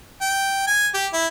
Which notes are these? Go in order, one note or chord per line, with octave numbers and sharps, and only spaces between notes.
G5
G#5
G4
E4